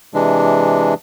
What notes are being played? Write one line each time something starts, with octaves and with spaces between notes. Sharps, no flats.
C3 E3 G#3 D4